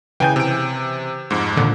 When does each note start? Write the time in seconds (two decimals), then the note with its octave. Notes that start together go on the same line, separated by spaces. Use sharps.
0.20 C#3 E3 G5 G#5 G6
0.36 C3 D7
1.31 F2 G#2
1.57 A#2 D3 D#3